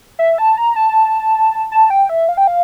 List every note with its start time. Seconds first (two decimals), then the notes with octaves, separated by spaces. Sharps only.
0.19 E5
0.38 A5
0.58 A#5
0.76 A5
1.72 A5
1.90 G5
2.09 E5
2.29 F5
2.37 G5
2.47 F5